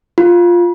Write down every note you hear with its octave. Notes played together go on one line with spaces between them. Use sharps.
F4